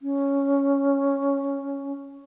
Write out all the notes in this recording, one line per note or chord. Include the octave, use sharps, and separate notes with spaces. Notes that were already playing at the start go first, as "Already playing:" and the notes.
C#4